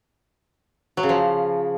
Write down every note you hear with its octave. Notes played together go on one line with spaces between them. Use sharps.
F#3
C#3
F3